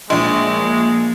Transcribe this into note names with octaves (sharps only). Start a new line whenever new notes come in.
A#1 F3 G#3 A#3